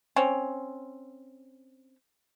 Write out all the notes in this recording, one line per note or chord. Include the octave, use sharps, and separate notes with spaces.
C4 C#4